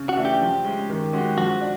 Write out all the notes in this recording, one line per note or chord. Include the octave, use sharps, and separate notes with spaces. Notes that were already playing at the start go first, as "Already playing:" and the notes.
Already playing: C#3
F#4
E3 A3 D4
G4
F3
G#3 C#4
D#3
G#3 C#4 F#4
F3 F#4
D4